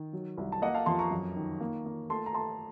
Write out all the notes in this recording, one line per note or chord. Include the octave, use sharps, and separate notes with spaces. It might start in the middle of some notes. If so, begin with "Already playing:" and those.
Already playing: D#3
F#3
C2
A5
A#3 D#5 F#5
F5 A5
F2 A5 C6
A#5 C#6
F#2
D#3
A#3
A#3
A3 A5 C6
A#5
A3 A5 C6